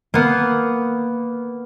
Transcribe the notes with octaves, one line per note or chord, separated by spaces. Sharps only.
A#3 B3